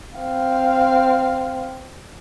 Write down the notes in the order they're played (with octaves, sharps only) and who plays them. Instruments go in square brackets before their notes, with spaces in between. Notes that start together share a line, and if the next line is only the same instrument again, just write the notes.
[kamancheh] C4 F5